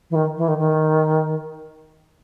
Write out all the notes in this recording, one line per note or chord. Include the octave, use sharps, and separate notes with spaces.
E3
D#3
E3
D#3
D#3